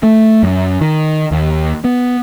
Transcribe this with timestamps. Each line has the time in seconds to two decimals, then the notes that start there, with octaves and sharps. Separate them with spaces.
0.03 A3
0.43 F#2
0.81 D#3
1.31 D#2
1.85 B3